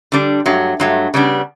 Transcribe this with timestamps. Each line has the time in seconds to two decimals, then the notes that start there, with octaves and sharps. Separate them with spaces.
0.12 D3 G3 D4
0.46 G2 F#3 A3
0.80 G2 F#3 A3
1.14 C#3 G3 B3 D4